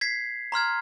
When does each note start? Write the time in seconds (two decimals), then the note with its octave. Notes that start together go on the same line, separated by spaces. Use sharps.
0.01 G#6 B6 C7
0.52 A#5 C6 F6 G#6